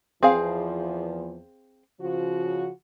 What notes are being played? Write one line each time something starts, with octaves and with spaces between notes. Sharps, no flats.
E2 F3 C4 G#4 F5
C#3 F3 F#4